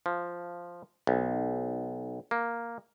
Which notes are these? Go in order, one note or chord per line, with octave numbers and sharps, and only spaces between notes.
F3
B1
A#3